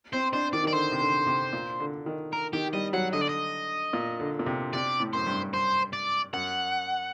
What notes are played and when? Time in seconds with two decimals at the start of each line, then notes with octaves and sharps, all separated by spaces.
0.13 C4 C5
0.33 D4 C5
0.53 D#3 D5
0.64 D#3
0.68 D5
0.72 D3 C5
0.92 C3
1.00 D3
1.17 D3
1.26 C3
1.53 A#2
1.80 D3
2.06 D#3
2.33 A#4
2.53 D#3 G4
2.73 G3 D#5
2.93 F#3 F#5
3.13 D3 D#5
3.21 D5
3.29 D#5
3.93 A#2
4.20 D3
4.39 A#2
4.46 C3
4.73 C3 D5
5.00 A2
5.13 F#2 C5
5.27 G2
5.54 C5
5.93 D5
6.33 F#2 F#5